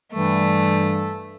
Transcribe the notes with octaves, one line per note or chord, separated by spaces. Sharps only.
G2 E3 G3 A3